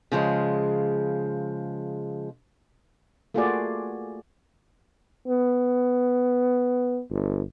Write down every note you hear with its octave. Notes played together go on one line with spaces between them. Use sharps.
C#3 F3 G#3
A3 A#3 F4 F#4 G#4 D5
B3
G1